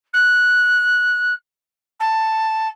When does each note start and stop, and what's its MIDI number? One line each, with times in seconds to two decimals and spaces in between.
0.13 1.33 90
1.99 2.68 81